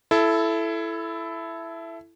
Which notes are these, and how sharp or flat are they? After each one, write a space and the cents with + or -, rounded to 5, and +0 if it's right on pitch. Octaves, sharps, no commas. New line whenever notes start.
E4 +15 A4 -10